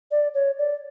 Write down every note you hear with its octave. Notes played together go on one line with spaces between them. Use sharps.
D5
C#5
D5